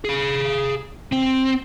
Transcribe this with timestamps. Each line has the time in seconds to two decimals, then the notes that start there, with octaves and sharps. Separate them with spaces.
0.04 G#4 F5
1.13 C4